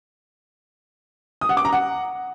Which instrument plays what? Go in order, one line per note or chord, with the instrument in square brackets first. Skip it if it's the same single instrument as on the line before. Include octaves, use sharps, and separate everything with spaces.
[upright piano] D#6
F#5
D6
A#5
F#5